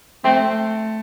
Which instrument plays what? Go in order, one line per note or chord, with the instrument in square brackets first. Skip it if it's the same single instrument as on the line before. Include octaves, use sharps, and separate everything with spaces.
[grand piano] A3 [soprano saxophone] C4